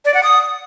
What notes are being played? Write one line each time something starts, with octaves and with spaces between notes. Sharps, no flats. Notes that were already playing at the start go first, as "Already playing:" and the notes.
D5
F#5
D#6